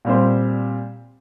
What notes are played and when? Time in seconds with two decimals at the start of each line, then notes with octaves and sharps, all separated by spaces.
0.05 A#2 G3 C4 G4 C5